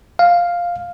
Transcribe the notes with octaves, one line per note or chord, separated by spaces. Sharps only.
F5